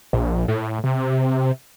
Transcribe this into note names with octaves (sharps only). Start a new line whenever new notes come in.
A#1
A2
C3